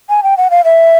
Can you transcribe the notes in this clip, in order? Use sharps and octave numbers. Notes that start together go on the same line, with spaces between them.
G#5
G5
F#5
F5
E5